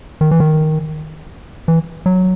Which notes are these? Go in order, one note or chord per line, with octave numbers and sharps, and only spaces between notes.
D#3
E3
D#3
E3
F#3